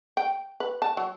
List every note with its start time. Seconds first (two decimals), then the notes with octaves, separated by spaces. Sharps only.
0.17 G5
0.60 B4
0.82 A5
0.97 F#3